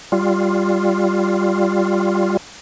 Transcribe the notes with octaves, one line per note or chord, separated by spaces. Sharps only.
G3 F4